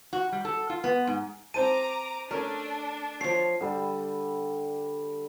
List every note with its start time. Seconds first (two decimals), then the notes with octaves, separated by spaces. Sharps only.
0.13 F#4
0.32 G3
0.45 A4
0.70 F4
0.84 B3
1.07 G#2
1.54 C4 C5 A5 A#5 D6 D#7
2.31 A3 C#4 D4 A#4
3.21 F3 C#5 C7
3.61 D3 G3